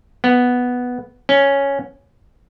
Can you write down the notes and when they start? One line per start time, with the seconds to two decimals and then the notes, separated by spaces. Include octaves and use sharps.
0.24 B3
1.29 C#4